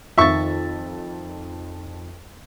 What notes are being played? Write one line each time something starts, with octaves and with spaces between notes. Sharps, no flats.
F2 D#3 E5 C#6 A6